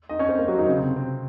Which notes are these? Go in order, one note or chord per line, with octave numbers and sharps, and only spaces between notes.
D#4 D#5
C#4 C#5
C4 C5
A#3 A#4
F#3 F#4
D#3 D#4
C#3 C#4
C3 C4
C3 C4